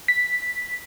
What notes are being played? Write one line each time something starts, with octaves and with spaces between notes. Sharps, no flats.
B6